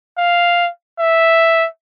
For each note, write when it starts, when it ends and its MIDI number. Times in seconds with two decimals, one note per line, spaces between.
0.17 0.69 77
0.99 1.67 76